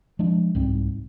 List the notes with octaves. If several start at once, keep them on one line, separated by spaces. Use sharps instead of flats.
F3 G#3 D4
C2 G#2 C4